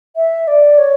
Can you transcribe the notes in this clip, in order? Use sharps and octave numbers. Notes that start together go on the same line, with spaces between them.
E5
D5
C#5